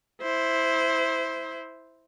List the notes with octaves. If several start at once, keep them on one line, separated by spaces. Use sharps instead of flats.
E4 C5